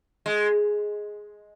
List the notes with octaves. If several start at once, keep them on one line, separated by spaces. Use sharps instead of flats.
G#3